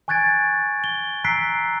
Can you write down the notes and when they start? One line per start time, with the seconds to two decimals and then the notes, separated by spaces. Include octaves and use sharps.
0.08 G#5 C#6 F#6 G#6 A6 D7
0.84 G7
1.24 A#5 E6 F#6 B6 C7 D7